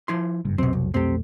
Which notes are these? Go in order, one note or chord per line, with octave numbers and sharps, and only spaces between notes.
F3 E4 C6
F#1 G2
F1 B1 B2 F#3 C4
C2
B1 F2 A3 C4 G4